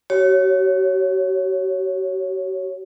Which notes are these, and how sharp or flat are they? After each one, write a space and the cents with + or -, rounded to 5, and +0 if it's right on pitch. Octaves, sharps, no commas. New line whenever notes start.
F#4 +45 C#5 -5